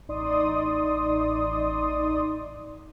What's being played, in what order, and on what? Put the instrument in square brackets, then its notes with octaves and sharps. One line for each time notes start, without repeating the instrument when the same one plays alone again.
[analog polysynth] A1 D#4 D5 C6 D#6